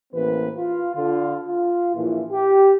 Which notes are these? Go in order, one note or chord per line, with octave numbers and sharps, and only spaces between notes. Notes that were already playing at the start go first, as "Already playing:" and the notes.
A1 E3 A#3 C4 B4
F4
D3 F4
F4
A#1 E3
G4